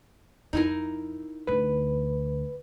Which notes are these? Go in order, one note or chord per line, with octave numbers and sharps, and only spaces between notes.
F2 D#4 E4 A#4
D2 D3 B4